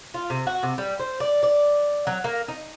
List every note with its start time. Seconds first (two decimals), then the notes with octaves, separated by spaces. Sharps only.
0.14 F4
0.30 C3
0.47 F#4
0.63 C3
0.78 G3
0.99 C5
1.20 D5
1.43 D5
2.07 F#3
2.24 A#3
2.48 D#4